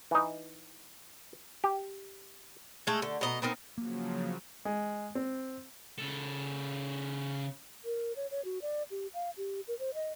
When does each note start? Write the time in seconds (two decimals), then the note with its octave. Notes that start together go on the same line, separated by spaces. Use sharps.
0.11 E3 D#4
1.64 G4
2.87 G#3 A3
3.02 D3
3.21 B2 D#5 A#5
3.42 B3 C4 D#4 A#4
3.78 C#3 F3 F#3 A#3
4.65 G#3
5.15 C4
5.98 C#3 A4
7.85 A#4
8.16 C#5
8.31 C#5
8.45 F#4
8.62 D5
8.91 G4
9.14 F5
9.37 G4
9.68 A#4
9.79 C5
9.94 D#5